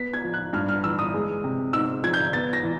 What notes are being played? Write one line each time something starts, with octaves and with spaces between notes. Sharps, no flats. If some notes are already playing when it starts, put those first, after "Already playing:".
Already playing: B3 B6
G#6
F3
F#6
G2 F6
F6
E3 E6
D#6
G#3
C3
G#2 E6
F3 G#6
G6
B3 A6
A#6
E3